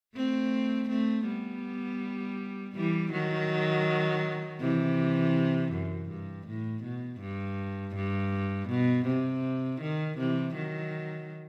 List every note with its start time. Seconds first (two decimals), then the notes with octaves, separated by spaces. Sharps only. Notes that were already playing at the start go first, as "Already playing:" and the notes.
0.15 A3 C4
0.89 A3 C4
1.27 G3 B3
2.75 E3 G3
3.12 D#3 F#3
4.60 C3 E3
5.73 F#2
6.09 G2
6.47 A2
6.83 B2
7.21 G2
7.95 G2
8.69 B2
9.06 C3
9.81 D#3
10.18 C3 E3
10.55 D#3 F#3